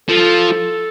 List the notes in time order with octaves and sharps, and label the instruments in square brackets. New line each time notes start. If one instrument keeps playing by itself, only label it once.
[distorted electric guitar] F3 [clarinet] A4